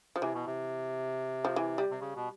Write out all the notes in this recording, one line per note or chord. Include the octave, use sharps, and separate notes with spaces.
F3
C3 E3
B2
C3
F3
E3
G3
C3
C#3
B2